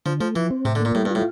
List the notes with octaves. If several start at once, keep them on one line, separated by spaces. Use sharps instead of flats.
D3 F3
F3 A3
E3 F3
C4
A2 C3
D3
A#3
A#2
A2 G3
G2
A2 F4